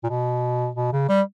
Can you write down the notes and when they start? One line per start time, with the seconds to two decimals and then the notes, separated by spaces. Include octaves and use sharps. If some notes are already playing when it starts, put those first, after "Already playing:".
0.04 A#2
0.09 B2
0.75 B2
0.93 C#3
1.09 G3